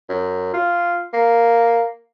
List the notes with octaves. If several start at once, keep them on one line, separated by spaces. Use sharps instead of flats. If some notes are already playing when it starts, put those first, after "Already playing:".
F#2
F4
A#3